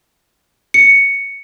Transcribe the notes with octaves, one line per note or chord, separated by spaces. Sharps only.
C#7